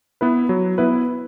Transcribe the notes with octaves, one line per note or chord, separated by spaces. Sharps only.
B3 E4 B4
F#3
B3 E4 B4